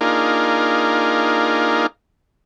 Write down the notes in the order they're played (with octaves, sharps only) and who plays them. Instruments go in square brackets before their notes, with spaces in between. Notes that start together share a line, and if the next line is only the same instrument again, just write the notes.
[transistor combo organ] A#3 D4 D#4 F4 G#4 A#4